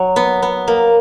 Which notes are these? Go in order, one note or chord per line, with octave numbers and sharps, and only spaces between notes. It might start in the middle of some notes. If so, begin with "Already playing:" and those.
Already playing: F#3
B3
B3
A#3